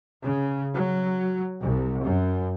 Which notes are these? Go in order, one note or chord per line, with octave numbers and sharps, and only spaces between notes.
C#3
F#3
C2
F#2